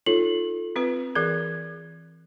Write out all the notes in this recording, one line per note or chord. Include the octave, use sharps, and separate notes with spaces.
D#4 F4 A4 C#5 F#7
C4 F4 B4
E3 G#4 A#4 G#6